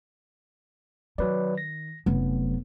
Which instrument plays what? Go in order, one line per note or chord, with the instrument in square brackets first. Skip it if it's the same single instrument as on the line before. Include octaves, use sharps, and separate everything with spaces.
[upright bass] D#3 [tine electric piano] F#3 B4 D5
[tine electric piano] A#6
[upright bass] F1 F#3 [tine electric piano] B3